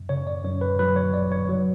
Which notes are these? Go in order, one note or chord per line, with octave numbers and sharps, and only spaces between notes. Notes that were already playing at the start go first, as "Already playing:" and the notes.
Already playing: F#2
C#3 C#5
D5
F#2 C#5
B4
F#3 B4
C#5
G1 D5
C#5
F#3